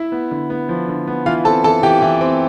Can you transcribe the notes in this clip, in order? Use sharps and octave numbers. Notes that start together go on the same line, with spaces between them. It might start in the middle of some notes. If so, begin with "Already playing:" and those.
Already playing: E4 E5
B3
D3
B3
F3
D3
B3
E3 F4 F5
C4 A4 A5
E3 A4 A5
E3 G4 G5
E3
C4